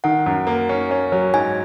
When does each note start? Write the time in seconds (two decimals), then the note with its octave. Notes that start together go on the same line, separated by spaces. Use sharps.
0.04 D#3 F#5
0.26 F#2
0.47 A#3
0.69 C#4
0.91 C#4
1.12 F#3
1.33 G#2 G#5